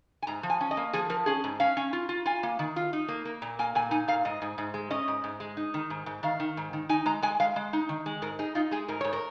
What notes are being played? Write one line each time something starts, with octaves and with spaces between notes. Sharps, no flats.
G#5
G#2 A#5
F3
G#5
C#4
D#5
A#3
F3 G#4
F3 A#4
C#4 G#4
G#2
C#4 F5
C#4
F4
F4
F4 G#5
A#3
D#3
F4
D#4
A#3
A#3
A#2
A#3 G#5
A#2 G#5
D#4 G#5
A#2 F5
G#2 D#5
G#2
G#2
G#3
C#4 D#5
G#2
G#2
G#3
D#4
D#3
G#2
G#2
D#3 F5
D#3
G#2
D#3
D#4 G#5
G#3 A#5
G#3 G#5
G#3 F5
G#3
D#4
D#3
G#3
G#2 A#4
D#4 G#4
D#4 F4
G#3 G#4
G#2 A#4
G#2 C#5
A#4